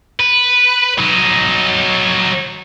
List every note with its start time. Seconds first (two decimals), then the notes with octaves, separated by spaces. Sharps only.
0.20 B4
0.98 F#3 D#4